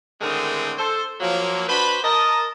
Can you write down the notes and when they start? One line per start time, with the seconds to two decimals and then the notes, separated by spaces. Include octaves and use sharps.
0.21 A2 D3 D#3 G#3 A3 C4
0.78 A4 C5
1.20 F3 F#3 A#3
1.68 D4 F#4 B4 C5 B5
2.03 A#4 D#5 A5